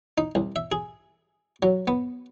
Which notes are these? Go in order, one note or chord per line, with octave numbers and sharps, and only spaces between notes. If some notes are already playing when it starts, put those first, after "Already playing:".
D#4
C2
E5
G#4
F#3
B3